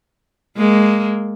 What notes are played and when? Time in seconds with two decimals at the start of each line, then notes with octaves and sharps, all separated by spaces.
0.57 G#3 A#3